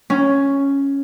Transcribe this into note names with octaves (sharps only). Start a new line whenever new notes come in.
C#4